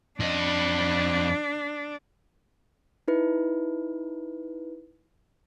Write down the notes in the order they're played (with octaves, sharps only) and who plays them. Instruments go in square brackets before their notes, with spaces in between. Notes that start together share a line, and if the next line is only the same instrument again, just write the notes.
[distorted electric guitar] F2 D#5 [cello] D4
[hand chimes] D#4 E4 B4